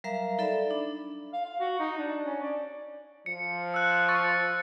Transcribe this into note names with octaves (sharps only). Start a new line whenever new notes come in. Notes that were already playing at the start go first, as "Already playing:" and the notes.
F#3 G3 A#4 E5 F5 A#5
D#4 A4 D5 E5 B5
D4
F5
F5
F#4
D#4
D4
C#4
D5
F3 C#7
E6 F#6
C#6 A6 C#7